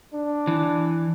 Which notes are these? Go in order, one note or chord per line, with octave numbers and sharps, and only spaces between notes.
D4
E3